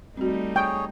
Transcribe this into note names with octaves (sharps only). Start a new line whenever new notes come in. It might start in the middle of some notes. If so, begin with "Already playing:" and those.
G3 A3 C4 D#4 F#4
G#4 C#5 G5